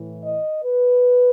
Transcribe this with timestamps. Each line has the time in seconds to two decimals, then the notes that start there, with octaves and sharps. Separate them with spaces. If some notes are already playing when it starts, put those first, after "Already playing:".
Already playing: A2 E3
0.23 D#5
0.64 B4